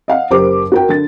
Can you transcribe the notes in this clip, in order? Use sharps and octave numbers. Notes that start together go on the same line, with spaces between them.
D#5 F5 F#5
F#1 G4 A#4 C5 D6
F#4 A#4 G5
D3 A6